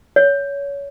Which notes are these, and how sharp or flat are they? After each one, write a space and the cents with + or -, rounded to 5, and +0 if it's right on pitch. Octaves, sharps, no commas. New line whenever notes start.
C#5 +25